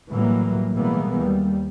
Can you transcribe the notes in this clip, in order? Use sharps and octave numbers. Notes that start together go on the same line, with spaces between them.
A2 E3 F#3 G3 A#3
B2 E3 G3 G#3 A#3 B3
D#2 G3